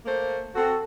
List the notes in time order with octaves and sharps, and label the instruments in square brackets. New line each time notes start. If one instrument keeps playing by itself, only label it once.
[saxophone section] A3 A#3 C5
[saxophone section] C4 F#4 [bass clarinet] A4